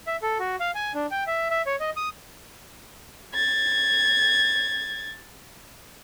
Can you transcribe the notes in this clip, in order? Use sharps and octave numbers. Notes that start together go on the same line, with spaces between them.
E5
A4
F#4
F5
G#5
D4
G5
E5
E5
C#5
D#5
D#6
G#6 A6